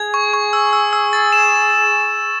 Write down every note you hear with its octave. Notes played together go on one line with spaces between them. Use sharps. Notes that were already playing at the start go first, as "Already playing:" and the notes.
Already playing: G#4 G#6
C#6
C#6
E6
E6
E6
A6
E7